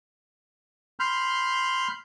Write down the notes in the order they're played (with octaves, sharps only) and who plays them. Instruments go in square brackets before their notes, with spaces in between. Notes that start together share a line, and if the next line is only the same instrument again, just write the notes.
[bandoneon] B5 C6 F6 G6